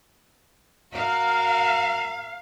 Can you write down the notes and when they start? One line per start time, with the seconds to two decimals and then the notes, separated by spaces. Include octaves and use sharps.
0.95 F#4 A#4 F5